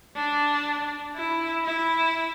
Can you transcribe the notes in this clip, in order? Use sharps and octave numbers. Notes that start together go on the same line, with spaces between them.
D4
E4
E4